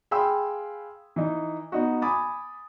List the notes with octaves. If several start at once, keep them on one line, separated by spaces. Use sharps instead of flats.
G#4 F5 G5 B5 C6 E6
E3 D#4
B3 D#4 F#4
G#5 B5 D6 D#6 A6